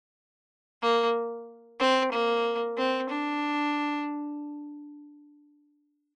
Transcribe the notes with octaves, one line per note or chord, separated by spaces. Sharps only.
A#3
C4
A#3
C4
D4